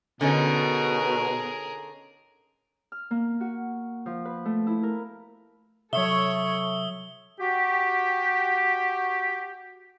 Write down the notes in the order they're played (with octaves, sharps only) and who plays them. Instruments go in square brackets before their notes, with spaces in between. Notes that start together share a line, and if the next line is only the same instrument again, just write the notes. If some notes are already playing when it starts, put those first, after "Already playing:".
[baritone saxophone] B2 [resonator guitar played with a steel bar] D3 C#4 D#4 [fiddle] G#4 A#4
[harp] F6
A#3
F#4
F3
B4
A3
E4
A#4
[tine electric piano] C3 F#3 [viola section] A4 C#5 [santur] E5 [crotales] D#6 E6 G7
[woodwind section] F#4 G4